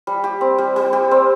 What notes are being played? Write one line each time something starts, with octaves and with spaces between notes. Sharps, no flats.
G3
G4
C4
G3
G3
G4
C4